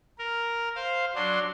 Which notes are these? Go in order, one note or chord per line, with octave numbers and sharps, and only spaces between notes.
A#4
C5 F5
F#3 D4 C6